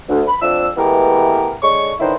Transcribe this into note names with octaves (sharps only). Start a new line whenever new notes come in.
D2
B5
F2 F3 D4 E6
E3 G#3 A3 B3 G4 A#4
D3 G#3 C#5 C#6
D3 D#3 C#4 E4 B4 C5